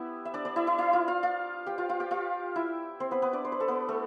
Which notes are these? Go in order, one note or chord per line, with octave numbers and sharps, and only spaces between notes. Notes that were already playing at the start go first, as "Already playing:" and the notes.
Already playing: B3 E4 G4 E5
E5
D4 D5
D4 D5
E4 E5
E4 E5
E4 E5
F4 F5
F4 F5
F4 F5
G4 G5
F4 F5
F4 F5
G4 G5
F4 F5
E4 E5
C4 C5
B3 B4
B3 B4
D4 D5
C5
B4
A4
B3 B4
A3 A4